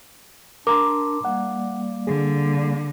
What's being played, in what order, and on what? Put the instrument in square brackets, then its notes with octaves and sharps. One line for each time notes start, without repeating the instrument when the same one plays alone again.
[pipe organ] D4 [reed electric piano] A#4 A#5 C6 [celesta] D6
[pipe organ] G3 A#3 [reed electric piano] F#5
[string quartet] D3 [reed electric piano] G#4